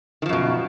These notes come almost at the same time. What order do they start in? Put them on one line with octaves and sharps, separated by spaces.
D#3 F3 F#2 B2